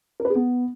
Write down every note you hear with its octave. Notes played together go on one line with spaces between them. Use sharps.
A#4
B4
G#4
B3